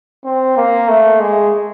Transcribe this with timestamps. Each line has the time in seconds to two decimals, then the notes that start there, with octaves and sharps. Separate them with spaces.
0.25 C4
0.57 A#3
0.89 A3
1.20 G#3